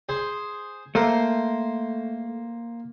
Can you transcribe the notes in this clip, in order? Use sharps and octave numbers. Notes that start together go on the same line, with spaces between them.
G#4 C5
A3 A#3 A#4 C5